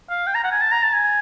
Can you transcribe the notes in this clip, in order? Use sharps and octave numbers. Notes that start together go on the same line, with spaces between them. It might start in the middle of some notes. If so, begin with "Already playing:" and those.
F5
G5
A#5
F#5
G#5
A5
A#5
A5
G#5